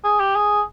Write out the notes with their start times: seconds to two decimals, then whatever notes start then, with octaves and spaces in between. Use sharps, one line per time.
0.04 G#4
0.20 G4
0.35 G#4